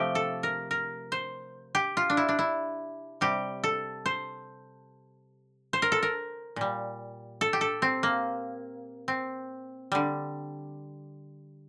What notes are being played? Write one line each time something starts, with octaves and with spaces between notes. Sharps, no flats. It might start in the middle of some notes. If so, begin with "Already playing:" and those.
Already playing: C3 F3 A3 G4
A4
A#4
A#4
C5
G4
F4
D4
E4
D4
E4
C3 G3 G4
A4
C5
C5
A#4
A4
A#4
A#2 G3
A4
G4
A4
C4
A#3
C4
D3 G3